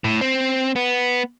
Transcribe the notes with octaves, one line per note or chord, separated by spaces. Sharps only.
A2
C4
B3